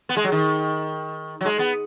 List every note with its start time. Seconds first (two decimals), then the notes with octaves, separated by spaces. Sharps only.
0.09 B3
0.17 G#3
0.24 F#3
0.32 D#3
1.41 F#3
1.45 G#3
1.59 B3